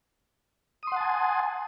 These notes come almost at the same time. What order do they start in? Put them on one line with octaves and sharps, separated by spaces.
D#6 C6 F#5 A5 G#5